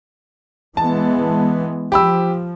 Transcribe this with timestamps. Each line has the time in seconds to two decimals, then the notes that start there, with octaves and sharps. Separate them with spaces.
0.77 E3 G#3 B3 A5
1.92 F3 G4 B5 E6